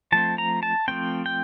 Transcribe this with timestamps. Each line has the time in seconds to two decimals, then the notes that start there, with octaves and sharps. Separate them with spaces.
0.12 F3 A3 C4 A5
0.38 A#5
0.63 A5
0.88 F3 A3 C4 G5
1.26 G5